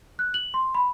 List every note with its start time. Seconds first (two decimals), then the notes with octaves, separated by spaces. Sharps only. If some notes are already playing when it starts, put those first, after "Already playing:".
0.19 F#6
0.34 F#7
0.54 C6
0.75 B5